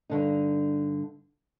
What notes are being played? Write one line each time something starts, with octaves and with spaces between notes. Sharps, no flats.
G2 D3 D#4